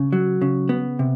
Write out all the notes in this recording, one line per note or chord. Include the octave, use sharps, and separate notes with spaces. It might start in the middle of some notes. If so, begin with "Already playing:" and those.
Already playing: C#3
F#3
C#3
B3
C3